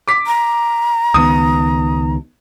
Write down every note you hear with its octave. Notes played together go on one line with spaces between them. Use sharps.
D6 B6
A#5
C#2 D#3 B3 D#6